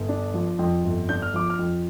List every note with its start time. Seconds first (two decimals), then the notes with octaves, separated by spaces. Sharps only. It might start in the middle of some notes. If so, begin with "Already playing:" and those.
Already playing: G1
0.09 D4
0.34 F3
0.59 F2
0.84 G1
1.09 D4 G6
1.22 F6
1.34 F3 D6
1.50 F6
1.59 F2